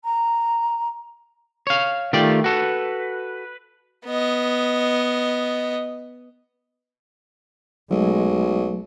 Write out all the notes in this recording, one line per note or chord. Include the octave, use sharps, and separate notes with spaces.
A#5
C#5 F5
D#3 A3 F4 G4 D5
F#4 A4 B4
B3 D#5
B1 F#3 G#3 A3